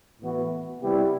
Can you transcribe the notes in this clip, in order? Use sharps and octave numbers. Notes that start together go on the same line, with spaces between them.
A2 E3 B3 F#4
C3 G3 B3 E4 G4